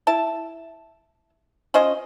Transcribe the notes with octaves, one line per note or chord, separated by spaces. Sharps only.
E4 A5
F3 C#4 C5 D#5